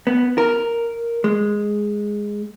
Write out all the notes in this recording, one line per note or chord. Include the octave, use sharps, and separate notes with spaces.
B3
A#4
G#3